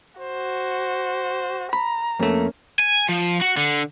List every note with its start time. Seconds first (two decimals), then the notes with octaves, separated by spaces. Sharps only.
0.20 F#4 C5
1.73 A#5 B5
2.19 F2 A3 A#3 C#4
2.79 G#5
3.09 F3
3.41 F#4
3.57 D3